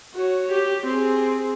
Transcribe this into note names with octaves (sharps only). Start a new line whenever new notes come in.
F#4 C#5
G4
C4 G#4